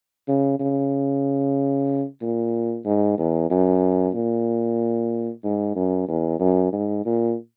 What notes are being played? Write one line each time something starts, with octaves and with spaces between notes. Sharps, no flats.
C#3
C#3
A#2
G#2
E2
F#2
A#2
G#2
F#2
E2
F#2
G#2
A#2